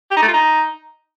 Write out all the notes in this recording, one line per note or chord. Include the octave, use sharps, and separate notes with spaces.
G4
D#4
A3
F4
D#4